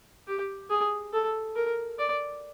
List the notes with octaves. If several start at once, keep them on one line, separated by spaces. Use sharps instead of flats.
G4
G#4
A4
A#4
D5